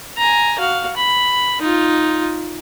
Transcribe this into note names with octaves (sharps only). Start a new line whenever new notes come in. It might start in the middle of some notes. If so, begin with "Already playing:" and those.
G#5 A#5
F#4 F5
B5
D#4 F4